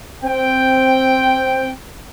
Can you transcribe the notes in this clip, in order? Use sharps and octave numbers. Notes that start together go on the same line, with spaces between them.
C4 G5